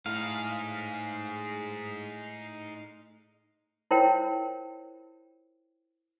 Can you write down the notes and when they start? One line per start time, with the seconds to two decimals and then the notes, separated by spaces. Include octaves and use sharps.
0.06 A2 D#4 G#4 F5
3.91 E4 F4 A#4 C5 C#5 G5